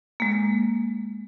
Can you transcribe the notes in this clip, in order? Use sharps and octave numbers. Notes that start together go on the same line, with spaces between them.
G#3 A#3